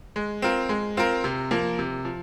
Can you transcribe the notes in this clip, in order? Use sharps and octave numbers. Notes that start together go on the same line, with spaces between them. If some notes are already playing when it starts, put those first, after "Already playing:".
G#3
C4 F4 A#4
G#3
C4 F4 A#4
C3
F3 A#3
C3
F3